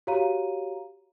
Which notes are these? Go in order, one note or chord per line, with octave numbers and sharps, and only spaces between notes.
F#4 G4 C#5 F5 A#5 D#7